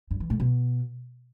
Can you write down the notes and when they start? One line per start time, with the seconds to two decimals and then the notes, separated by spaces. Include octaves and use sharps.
0.11 G2
0.20 E3
0.30 A2
0.40 B2